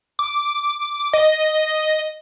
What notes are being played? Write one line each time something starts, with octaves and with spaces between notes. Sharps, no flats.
D6
D#5